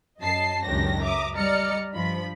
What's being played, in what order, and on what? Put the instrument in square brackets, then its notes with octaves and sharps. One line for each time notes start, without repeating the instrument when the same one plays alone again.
[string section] F#2 D#5 A5 C7
C#2 F#2 D#3 D4 G4 A#6
E5 A#5 D6 D#6
G3 D5 D#5 A#5 F6 C#7
G2 F3 B5